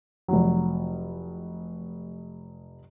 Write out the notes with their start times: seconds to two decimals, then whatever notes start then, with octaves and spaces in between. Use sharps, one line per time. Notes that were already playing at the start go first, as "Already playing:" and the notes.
0.28 F1 F#3